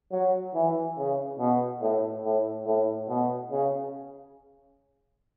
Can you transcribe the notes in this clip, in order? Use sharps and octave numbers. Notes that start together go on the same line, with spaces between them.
F#3
E3
C#3
B2
A2
A2
A2
B2
C#3